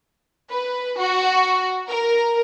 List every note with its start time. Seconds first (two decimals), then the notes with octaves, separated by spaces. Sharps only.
0.50 B4
0.99 F#4
1.89 A#4